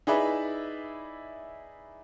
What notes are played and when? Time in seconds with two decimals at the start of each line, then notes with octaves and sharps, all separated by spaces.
0.07 D#4 E4 G#4 B4 D5 E5